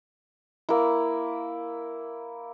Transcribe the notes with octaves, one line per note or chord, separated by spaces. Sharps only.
A#3 E4